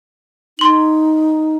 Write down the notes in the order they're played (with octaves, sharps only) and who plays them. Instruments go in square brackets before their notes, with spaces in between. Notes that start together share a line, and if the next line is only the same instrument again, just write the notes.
[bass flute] D#4 [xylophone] C6 F#7